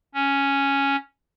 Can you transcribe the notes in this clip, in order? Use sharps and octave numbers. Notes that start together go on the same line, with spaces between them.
C#4